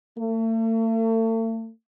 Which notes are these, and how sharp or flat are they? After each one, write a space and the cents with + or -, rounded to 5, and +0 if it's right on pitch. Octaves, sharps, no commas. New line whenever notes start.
A3 +40